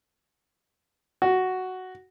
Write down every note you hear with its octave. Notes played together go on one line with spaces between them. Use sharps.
F#4